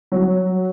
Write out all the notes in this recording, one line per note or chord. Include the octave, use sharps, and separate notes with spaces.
F#3